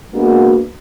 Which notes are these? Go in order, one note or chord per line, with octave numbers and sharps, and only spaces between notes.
G#3 A#3 B3 D4 F#4